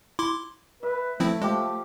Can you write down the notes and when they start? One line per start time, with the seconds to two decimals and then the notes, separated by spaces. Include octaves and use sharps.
0.19 E4 C6 D6
0.83 B4 E5
1.20 F3 A3 C4 E4
1.42 F3 G#3 G4